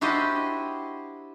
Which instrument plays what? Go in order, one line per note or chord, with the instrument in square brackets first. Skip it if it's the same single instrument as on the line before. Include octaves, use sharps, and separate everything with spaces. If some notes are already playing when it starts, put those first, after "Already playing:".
[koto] D4 E4 F#4 G4 C5 D#5